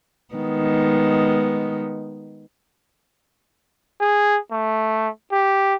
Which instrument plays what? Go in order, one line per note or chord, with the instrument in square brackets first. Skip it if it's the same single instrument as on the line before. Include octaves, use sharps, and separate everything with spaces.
[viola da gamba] D#3 G#3 B3
[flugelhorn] G#4
A3
G4